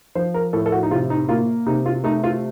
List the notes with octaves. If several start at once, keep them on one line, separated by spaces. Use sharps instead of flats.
F3 C5
A#4
A2 A4
A4
F#4
D#4
C3 F4
D#4
A#3 F4
C3 D#4
F4
A3 D#4
F4